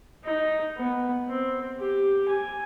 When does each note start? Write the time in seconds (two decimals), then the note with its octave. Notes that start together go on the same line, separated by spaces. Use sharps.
0.24 D#4
0.77 B3
1.29 C4
1.79 G4
2.28 G#5